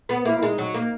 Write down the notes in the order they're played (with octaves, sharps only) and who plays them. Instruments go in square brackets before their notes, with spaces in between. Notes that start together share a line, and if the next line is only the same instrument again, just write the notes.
[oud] B3
[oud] A#3 [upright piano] E4
[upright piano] E4
[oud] G#3 [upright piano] D#4
[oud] F#3
A#3